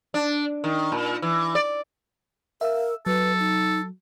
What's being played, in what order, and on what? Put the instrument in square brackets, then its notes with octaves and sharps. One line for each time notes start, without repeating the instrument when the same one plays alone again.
[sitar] D4
D#3
A#2
E3
D5
[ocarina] A#4 [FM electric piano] E5 F5 E6
[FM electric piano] F#3 [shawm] A4 [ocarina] B4
[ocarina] D#4